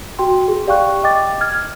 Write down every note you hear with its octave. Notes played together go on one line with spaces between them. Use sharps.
F#4 G5 C6
G#4
G4 D5 F5 G5 C#6 F#6
D#5 G5 D6 A6
F6 G#6